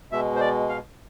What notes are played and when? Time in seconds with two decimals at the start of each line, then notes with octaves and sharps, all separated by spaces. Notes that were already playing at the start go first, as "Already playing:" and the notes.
0.12 B2 G#3 E5
0.36 C5
0.41 D5
0.69 F5